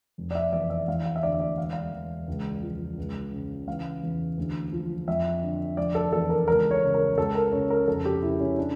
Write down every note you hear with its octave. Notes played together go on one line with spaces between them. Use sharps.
F1
D5
E5
E2 D5
E5
E3 F5
F5
E5
D2 D5
D5
E1 F5
F5
E1
C#2
F3
C#2
C#3
E3 F5
E2
D2
F3
F2 E5
D3
F1 D5
A4
E2 A4
A#4
C#2 A#4
C#5
C#3
A#4
C#2 A4
A#4
C#3 C#5
A#4
F1 A4
G4
C#3 E4
C#4
D4